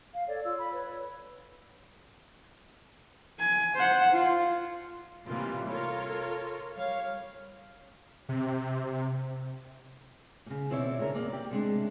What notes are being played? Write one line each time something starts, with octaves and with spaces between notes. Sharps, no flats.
F5
A4 C#5 D5
F4 E6
B5
B4 C#5
G#5
C5 F#5
F4
A2 C3 E3 G3 A#3 F4
F4 A4 A#4 C#5
G3 C#5 F5
C3
A#2 C#3
D#2 B2 C4 E4 C#5 D5
D2 C#3 D4 A#4
E2 A#3 D5
G4 D5
C3 G#3 D4